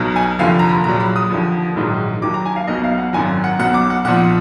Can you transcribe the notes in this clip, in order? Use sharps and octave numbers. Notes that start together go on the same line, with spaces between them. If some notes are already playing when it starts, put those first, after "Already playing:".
Already playing: B1 B2 F#3
G#5
F1 D#2 D3 F3 F5
A#5
B5
A#1 A#2 F#3 A#5
B5
D#6
D#2 D3 F3
A#1 G#2 D#3 F#3
D#2 D#3 F#3 D6
A#5
G#5
F5
B1 B2 F#3 D#5
F5
F#5
G#1 F#2 D#3 F#3 G#5
F#5
B1 B2 F#3 F#5
D6
F#5
B1 A#2 F3 F#5